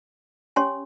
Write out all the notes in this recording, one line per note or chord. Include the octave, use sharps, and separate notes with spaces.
C#4 G4 C#5 G#5 C6